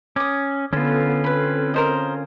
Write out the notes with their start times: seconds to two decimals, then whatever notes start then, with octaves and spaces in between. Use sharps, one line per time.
0.16 C#4 D6 D#6
0.73 D3 B3 C#4 F4 A4
1.24 C4 A4 B4 B5
1.74 A#4 C5 D#5